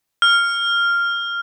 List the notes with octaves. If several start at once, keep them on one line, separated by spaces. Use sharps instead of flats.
F6